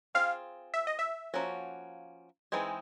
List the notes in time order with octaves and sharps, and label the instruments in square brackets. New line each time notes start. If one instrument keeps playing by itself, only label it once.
[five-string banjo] C4 F4 G#4 [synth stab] F5
[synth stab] E5
D#5
E5
[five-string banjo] F3 A#3 C#4 F#4
E3 G#3 C4 D#4 G#4